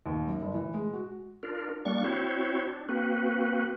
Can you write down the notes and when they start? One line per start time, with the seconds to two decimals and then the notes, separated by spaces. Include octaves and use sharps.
0.06 D#2
0.27 F#2
0.42 G1
0.54 E3
0.74 G#3
0.93 F#4
1.43 D4 F4 A#4
1.85 G3 A#3 D4 C#6
2.04 C4 E4 F#4 C5 C#5
2.67 D4
2.89 A#3 C4 F#4 B4